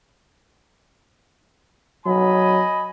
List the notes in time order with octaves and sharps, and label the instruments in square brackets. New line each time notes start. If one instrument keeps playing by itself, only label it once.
[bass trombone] F#3 [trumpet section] D#5 G#5 B5